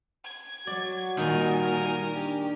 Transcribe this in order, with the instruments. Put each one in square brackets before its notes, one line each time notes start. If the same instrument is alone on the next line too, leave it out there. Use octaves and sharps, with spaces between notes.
[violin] G#6
[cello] F#3 [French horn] F#4 [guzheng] D5
[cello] A#2 G3 [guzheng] D#3 [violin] A#4 G#5
[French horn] D4 [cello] G4